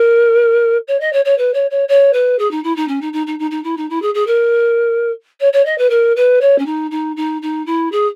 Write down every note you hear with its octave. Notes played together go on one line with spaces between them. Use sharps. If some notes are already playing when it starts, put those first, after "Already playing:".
Already playing: A#4
C#5
D#5
C#5
C#5
B4
C#5
C#5
C#5
B4
G#4
D#4
E4
D#4
C#4
D#4
D#4
D#4
D#4
D#4
E4
D#4
E4
G#4
G#4
A#4
C#5
C#5
D#5
B4
A#4
B4
C#5
C#4
D#4
D#4
D#4
D#4
E4
G#4